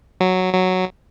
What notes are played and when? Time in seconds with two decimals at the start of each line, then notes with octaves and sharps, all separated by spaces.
0.20 F#3
0.54 F#3